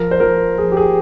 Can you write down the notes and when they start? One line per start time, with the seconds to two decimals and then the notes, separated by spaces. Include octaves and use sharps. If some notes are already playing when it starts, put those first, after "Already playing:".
Already playing: F3 A#4
0.11 C5
0.20 F3 A#4
0.58 F3 G#4
0.72 G4
0.77 G#4